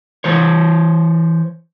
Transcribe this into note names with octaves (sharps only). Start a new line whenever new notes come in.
E3 C5 C#5